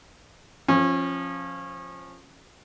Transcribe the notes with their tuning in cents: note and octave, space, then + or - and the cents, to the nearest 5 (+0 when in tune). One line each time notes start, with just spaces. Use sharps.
F3 +0 C#4 -25